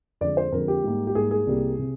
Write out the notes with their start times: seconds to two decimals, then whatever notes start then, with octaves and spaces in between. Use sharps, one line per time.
0.21 F2 D3 G#3 D5
0.37 C5
0.52 F2 D3 G#3 A#4
0.68 G4
0.84 G#2 G3 A#3
1.07 G4
1.15 G#2 G3 A#3 G#4
1.31 G#4
1.46 C2 C3 G3 A#3
1.79 C3